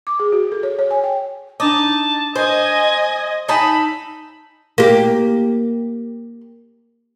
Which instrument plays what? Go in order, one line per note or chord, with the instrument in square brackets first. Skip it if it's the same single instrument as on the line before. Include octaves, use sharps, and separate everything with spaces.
[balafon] D6
G#4
F#4
A4
C#5
C#5
G#5
G5
[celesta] D4 D6 [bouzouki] D#4 [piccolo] A5
[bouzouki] C5 [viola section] D#5 [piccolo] G#5
[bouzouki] D#4 E5 A5 [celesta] G#5 D#6 [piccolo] B5
[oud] A#3 G4